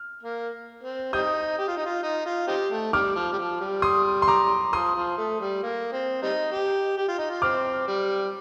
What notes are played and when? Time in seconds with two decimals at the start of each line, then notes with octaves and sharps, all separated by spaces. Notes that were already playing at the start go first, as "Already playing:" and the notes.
Already playing: F6
0.23 A#3
0.84 C4
1.13 G3 C4 D#4 D#6 G6
1.58 G4
1.68 F4
1.77 D#4
1.86 F4
2.03 D#4
2.26 F4
2.48 C4 D#4 G4
2.71 A3
2.93 C3 D#3 G3 D6 F6
3.15 F3
3.32 G3
3.38 F3
3.60 G3
3.82 C6 D#6
4.22 C6
4.28 A#5 D6
4.72 F3 C6 D#6
4.96 F3
5.18 A3
5.40 G3
5.63 A#3
5.93 C4
6.23 G3 C4 D#4
6.52 G4
6.98 G4
7.08 F4
7.19 D#4
7.30 F4
7.42 C4 D6 F6
7.87 G3